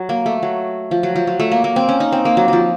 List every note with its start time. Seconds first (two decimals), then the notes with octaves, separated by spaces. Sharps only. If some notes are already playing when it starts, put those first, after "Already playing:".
Already playing: F#3
0.09 A#3
0.26 A3
0.43 F#3
0.91 F3
1.03 F#3
1.16 F3
1.27 F#3
1.40 A3
1.52 A#3
1.64 A#3
1.76 C4
1.89 C#4
2.00 D#4
2.12 C4
2.25 A#3
2.37 F#3
2.48 F3 F#3